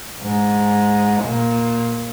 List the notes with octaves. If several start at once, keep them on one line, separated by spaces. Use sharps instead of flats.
G#2
A#2